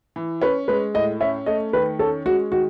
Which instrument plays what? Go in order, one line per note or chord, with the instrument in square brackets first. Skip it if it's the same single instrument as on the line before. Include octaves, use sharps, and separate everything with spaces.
[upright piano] E3
[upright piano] C#4 [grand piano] B4
[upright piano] G#3 [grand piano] B4
[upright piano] A2 [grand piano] D#5
[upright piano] C#4 [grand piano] E5
[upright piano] A3 [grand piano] D#5
[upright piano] D#3 [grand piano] B4
[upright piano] C#4 [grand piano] A4
[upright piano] G#3 [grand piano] F#4
[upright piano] D#3 [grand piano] F#4